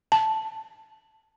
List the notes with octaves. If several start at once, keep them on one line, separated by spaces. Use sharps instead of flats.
A5